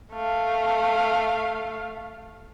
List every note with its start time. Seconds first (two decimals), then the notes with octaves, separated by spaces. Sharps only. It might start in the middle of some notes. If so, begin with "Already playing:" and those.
0.13 A3 F5